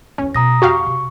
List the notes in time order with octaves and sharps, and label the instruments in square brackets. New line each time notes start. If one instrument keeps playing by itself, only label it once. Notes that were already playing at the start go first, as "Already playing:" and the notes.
[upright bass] E2 B3 [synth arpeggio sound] C#4
[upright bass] B2 [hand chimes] A#5 D#6 A#6
[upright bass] F2 [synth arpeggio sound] F#4 G4 F5 [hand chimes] C#6
[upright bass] C3